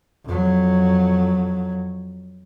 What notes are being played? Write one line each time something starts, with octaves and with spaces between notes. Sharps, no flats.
F2 F#3